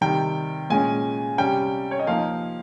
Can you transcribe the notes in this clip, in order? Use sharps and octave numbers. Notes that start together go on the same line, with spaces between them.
C3 D#3 G3 G5
A#2 G#3 C#4 G#5
C3 G3 C#4 G5
C#5
D#5
F3 A#3 D#4 F5